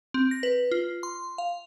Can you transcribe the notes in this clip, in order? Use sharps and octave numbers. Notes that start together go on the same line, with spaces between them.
C4
A#6
B4
F4
C6
F5